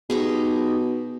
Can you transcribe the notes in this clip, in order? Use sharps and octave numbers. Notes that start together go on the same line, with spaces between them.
B2 D#4 G4 G#4